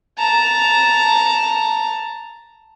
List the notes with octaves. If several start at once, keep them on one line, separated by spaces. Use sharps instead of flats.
A5 A#5